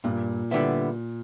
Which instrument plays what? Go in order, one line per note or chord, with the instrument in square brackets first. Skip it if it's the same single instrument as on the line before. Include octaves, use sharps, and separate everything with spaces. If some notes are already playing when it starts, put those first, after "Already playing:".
[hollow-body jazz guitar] G2 [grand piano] A#2
[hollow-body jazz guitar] D3 G3 B3 E4